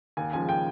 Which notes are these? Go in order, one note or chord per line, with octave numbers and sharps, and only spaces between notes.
D#2 G#5
C#3 F3 G#3 G#5
G5